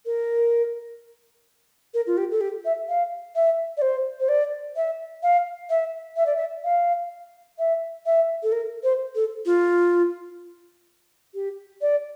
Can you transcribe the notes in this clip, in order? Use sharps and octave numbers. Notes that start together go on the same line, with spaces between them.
A#4
A#4
F4
G4
A4
G4
E5
F5
E5
D5
C5
C5
D5
E5
F5
E5
E5
D5
E5
F5
E5
E5
A4
A#4
C5
A4
F4
G4
D5